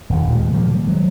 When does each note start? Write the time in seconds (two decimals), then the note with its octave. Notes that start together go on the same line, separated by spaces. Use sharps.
0.10 D#1 D#2
0.31 A#2 G#3
0.53 D#3 F3 G3 A#3
0.88 F#3 G#3